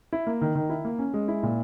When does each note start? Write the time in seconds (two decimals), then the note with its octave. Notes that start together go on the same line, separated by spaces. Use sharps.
0.13 E4
0.27 A#3
0.41 D#3
0.55 D#3
0.70 E4
0.85 A#3
0.99 C#4
1.14 G#3
1.28 E4
1.43 A#2